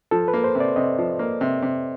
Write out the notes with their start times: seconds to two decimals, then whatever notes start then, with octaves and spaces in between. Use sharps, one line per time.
0.11 F3 A4
0.28 B4
0.34 A#3
0.44 C5
0.55 C3
0.60 D5
0.76 C3 D#5
0.98 F3
1.19 A#3
1.41 C3
1.62 C3